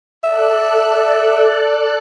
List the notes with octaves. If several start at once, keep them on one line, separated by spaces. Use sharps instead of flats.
A4 D5 E5 F#6